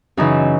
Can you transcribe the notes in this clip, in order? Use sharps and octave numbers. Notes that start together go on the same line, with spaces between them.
F#2 C#3 E3 D#4